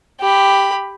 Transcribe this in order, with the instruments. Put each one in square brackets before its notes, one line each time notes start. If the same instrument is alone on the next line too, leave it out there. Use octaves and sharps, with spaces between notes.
[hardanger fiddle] G4 B5